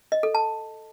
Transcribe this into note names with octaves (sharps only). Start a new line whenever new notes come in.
D#5
A4
A5